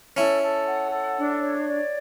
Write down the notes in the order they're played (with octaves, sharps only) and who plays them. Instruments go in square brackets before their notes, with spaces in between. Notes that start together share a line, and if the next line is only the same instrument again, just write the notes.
[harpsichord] C#4 E4 [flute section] A4
[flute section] A4
F#5
A4
D4
C#5
D5